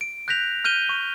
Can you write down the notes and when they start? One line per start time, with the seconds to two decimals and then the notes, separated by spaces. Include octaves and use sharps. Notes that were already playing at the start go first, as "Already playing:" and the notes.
0.01 D7
0.28 F#6 G6 A#6 B6 F7
0.64 F6 G6 D#7 G7
0.89 C#6